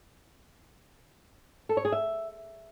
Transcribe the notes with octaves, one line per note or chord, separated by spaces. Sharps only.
A4
C#5
G#4
E5